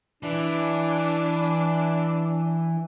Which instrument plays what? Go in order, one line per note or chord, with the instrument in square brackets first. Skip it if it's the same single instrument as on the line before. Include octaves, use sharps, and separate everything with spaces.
[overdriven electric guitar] E3 [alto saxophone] D4